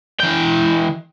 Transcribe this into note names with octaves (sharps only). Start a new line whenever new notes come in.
E3 G5